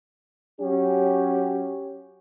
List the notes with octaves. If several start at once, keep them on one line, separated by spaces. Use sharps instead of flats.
F#3 C#4 G4